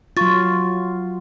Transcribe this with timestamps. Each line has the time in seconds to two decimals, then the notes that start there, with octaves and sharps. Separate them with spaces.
0.17 F#3 F4 C#6 A6